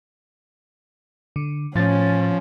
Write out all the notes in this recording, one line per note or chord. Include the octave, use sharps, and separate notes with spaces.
D3
A2 F3 C#4 A6